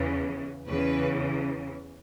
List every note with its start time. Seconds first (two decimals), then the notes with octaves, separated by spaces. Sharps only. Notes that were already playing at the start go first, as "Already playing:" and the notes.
Already playing: E2 C#3 E3
0.68 E2 C#3 E3 B4